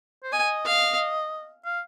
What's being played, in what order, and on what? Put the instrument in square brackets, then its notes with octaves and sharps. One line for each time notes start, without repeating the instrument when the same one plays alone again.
[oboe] C5
[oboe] D#5 [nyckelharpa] G#5
[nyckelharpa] F5
[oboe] F5